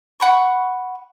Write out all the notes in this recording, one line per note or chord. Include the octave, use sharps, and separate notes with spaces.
F#5 B5 C#6